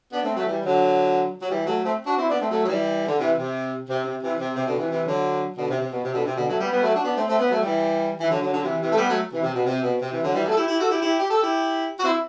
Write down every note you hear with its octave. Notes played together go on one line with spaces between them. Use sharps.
B3 D4
A3 C4
F#3 A3
E3 G3
D3 F#3
F#3
E3 G3
F#3 A3
A3 C4
D4 F#4
C4 E4
B3 D4
A3 C4
F#3 A3
F#3
E3 G3
D3
C3 E3
C3
C3
C3
C3 E3
C3
C3
B2 D3
C3 E3
C3 E3
D3 F#3
B2 D3
C3
C3
B2
C3
B2 D3
C3
B2 D3
F#3 A3
G3 B3
G3 B3
F#3 A3
D4 F#4
B3 D4
A3 C4
A3 C4
B3
F#3 A3
E3 G3
E3
D3 F#3
D3 F#3
D3 F#3
C3 E3
C3 E3
A3
G3 B3
F#3 A3
C3 E3
C3
B2
C3
B2
C3
C3 E3
D3 F#3
E3 G3
F#3 A3
A4
E4 G4
E4 G4
F#4 A4
E4 G4
E4 G4
G4
A4
E4 G4
F#4
C4 E4